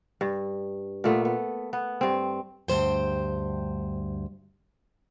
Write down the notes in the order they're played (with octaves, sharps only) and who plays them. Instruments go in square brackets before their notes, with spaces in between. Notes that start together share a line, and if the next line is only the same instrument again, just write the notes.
[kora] G2
A#2 A3 B3
B3
B3
G2 C4
[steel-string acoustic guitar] D2 G2 F#3 C5 G5